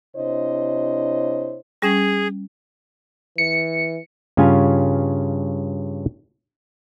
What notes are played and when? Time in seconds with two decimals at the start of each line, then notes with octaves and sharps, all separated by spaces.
0.16 C3 D4 E4 C5 C#5 D#5
1.82 G3 C#4 G#4
3.38 E3 C#7
4.37 G2 C#3 C#4 F4 F5 G#5